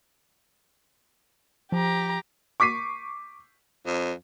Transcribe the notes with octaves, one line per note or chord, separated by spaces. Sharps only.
F3 G4 A#5
C#6 D6 B6 C7 D#7
F2